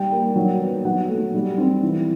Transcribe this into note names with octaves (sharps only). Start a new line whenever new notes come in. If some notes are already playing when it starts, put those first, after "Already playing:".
Already playing: G3 G5
A#3
F#3
B3
F#3 F#5
A3
G3
C4
E3